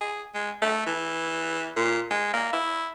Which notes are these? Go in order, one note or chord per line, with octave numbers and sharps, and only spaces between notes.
G#4
G#3
A3
E3
A#2
G#3
A#3
E4